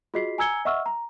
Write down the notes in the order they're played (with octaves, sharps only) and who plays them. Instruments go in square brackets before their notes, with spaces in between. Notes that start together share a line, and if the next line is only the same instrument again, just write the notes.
[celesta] F4 F#4 G#4 D#5 B6 C7
G#5 A#5 E6 G#6 C#7 G7
D#5 E5 F#5 C#6 E6 F6
A#5